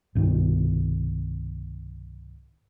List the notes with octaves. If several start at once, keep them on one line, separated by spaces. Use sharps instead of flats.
C2 G2 B2 D#3